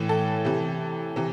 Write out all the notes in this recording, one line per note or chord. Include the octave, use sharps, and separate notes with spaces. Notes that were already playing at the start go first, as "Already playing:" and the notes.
Already playing: A2 E3
A4
C3 E3
C3 E3